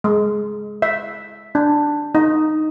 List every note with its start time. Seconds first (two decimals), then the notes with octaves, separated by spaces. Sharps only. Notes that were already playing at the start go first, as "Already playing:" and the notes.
0.04 G#3
0.82 E5
1.55 D4
2.15 D#4